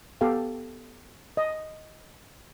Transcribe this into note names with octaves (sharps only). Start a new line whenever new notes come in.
B3 G4 A4 F5
D#5